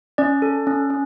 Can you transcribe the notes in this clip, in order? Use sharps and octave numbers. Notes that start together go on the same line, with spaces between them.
C#4 D5
A4
C#4
C#4